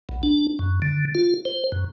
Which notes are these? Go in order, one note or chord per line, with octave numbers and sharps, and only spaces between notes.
B1
D4
F#2
D3
F4
C5
F#2